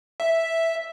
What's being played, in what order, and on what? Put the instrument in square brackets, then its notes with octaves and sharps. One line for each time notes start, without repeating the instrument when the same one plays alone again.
[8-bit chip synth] E5